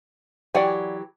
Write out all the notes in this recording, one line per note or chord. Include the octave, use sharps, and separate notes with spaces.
E3 F#3 G4 D5 F#5 G#5